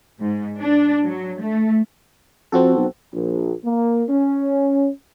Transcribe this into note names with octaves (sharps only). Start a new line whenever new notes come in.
G#2
D4
F#3
A3
F2 C4 F#4 A4
B1
A#1
A#3
C#4